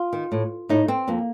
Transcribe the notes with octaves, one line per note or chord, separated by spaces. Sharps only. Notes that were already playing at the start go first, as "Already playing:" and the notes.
Already playing: F4
D#3
A2
A2 D#4
C4
F2 A#3